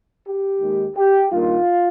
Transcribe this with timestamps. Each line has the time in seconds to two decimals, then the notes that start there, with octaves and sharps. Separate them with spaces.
0.26 G4
0.60 D#2 D#3 G#3
0.96 G4
1.31 G2 D#3 A#3 F4